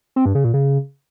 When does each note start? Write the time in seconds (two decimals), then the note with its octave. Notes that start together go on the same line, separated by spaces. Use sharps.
0.16 C4
0.26 G2
0.35 C#3
0.44 A#2
0.54 C#3